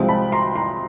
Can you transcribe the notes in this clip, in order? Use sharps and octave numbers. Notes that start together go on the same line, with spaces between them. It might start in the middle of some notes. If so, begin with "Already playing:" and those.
Already playing: C2 C3 F3 G#3 C4 G5
A5 B5
A#5 C6
A#5 C6